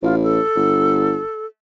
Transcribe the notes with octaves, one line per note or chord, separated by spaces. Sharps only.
A1 F4
A4
G1